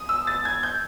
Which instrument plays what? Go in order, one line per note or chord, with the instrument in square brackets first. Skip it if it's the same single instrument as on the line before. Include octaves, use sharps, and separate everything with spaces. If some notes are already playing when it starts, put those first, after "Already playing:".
Already playing: [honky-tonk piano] D#6
E6
A6
G#6
G6